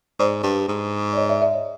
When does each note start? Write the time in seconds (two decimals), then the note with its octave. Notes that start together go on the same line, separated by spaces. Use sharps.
0.19 G#2 C5 D5
0.43 G2
0.68 G#2
1.13 D5
1.17 C#5 D#5
1.29 D5 E5
1.41 D5 E5
1.54 C#5 D#5